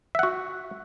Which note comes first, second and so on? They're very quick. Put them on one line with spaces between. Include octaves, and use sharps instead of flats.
E5 F#5 F#4